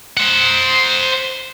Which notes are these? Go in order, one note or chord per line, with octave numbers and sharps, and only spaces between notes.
C5 F#5